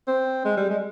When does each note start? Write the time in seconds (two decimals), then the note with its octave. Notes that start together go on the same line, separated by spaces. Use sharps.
0.07 C4
0.45 G#3
0.57 G3
0.70 G#3